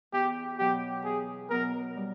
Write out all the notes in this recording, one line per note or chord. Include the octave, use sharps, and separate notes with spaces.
E2 G4
B2 F#3 B3 G4
E2 G#4
B2 F#3 B3 A#4
G3